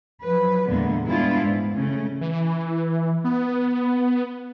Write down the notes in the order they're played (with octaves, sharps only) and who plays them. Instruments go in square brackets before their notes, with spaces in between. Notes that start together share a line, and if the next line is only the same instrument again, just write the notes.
[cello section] F3 F#3 B4
E2 A#2 D3 G#3 A#3 B3
G2 G#3 B3 D4 E4 F4
G#2
C#3 A3 C#4
[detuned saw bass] E3
B3